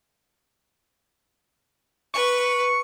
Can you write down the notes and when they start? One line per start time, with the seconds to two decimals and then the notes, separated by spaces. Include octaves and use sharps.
2.14 B4 C#6